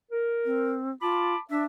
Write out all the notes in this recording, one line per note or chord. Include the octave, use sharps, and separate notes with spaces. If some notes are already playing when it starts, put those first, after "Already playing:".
A#4
C4
F4 A5 B5 D6
D4 E5